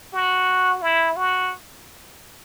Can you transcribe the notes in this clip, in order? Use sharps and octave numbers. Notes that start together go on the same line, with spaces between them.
F#4
E4
F#4